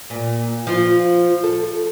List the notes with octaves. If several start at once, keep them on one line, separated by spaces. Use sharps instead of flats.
A#2
F3 F4
A4